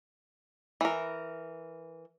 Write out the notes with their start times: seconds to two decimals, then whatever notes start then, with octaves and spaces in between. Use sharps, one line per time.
0.81 E3 A#4